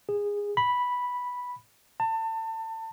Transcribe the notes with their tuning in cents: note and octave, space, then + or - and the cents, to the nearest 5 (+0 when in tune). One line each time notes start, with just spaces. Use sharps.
G#4 -20
B5 -5
A5 +30